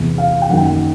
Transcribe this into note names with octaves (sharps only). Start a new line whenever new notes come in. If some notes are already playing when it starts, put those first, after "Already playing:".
Already playing: E2 C3 E3
F5
G5
F#2 D#3 F#3 A#3 F#5
G5